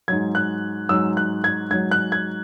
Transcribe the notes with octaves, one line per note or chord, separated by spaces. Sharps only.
G#2 F#3 G#6
F#6
G#2 F#3 E6
F#6
G#6
G#2 F#3 G#6
F#6
G#6